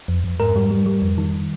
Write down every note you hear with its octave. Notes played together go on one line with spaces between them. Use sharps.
F2
F2
G#2 A#4
G3
G3
G3
F2
D#3